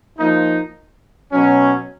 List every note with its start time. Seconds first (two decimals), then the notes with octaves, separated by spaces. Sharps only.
0.18 F3 A#3 D#4
1.32 B2 F#3 C#4